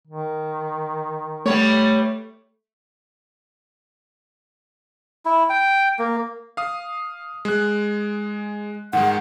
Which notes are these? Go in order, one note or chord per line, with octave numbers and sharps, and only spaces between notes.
D#3
G3 A3 B3 C#5
E4
G5
A#3
F5 D#6
G#3 F#6
G#2 D#3 G#3 F#5